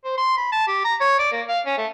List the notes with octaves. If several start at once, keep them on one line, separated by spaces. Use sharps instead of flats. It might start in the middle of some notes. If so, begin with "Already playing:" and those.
C5
C6
B5
A5
G4
A#5
C#5
D5
A#3
F5
C#4
A3